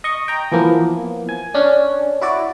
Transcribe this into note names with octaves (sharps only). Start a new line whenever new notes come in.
D#5 C#6
G5 A#5
E3 F3 A#3 B3
G#5
C#4 D4
E4 F#4 D5